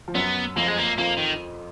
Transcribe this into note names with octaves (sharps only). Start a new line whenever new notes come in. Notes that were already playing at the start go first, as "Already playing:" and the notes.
F3
F#2 F#3 B3
F2 F3 A#3
G#3
A#3
F2 F3 A#3
D#3